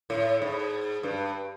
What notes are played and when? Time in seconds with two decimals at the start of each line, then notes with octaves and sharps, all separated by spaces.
0.10 A2
0.42 G#2
1.03 G2